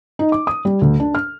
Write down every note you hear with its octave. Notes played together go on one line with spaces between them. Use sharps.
D#4
D6
D#6
G3
D2
D4
F6